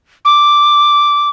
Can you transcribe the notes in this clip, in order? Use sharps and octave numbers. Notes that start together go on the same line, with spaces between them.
D6